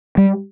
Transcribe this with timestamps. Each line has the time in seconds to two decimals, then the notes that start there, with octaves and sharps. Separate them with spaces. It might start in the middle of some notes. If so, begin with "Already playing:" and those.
0.17 G3